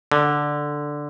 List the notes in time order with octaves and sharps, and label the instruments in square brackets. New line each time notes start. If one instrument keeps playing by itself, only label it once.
[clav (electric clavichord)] D3